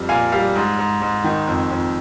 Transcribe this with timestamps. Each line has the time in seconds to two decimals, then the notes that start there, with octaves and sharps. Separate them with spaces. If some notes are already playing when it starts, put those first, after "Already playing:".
Already playing: F2 G3
0.09 A#2 F5 G#5
0.32 G3 F5
0.55 G#2
0.79 G#2
1.02 G#2
1.24 D#3
1.47 F2
1.70 F2